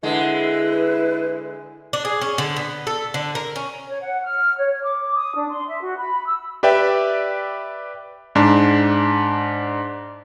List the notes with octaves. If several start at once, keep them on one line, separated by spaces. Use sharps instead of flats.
D3 G#3 E4 B4
D4
G#4
C#4
D3
B3
A4
D3
A#4
C#4
C#5
F#5
F6
C#5
D6
D#6
D4
C6
E5
F#4
B5
E6
G4 B4 D5 E5 G5
G#2 D4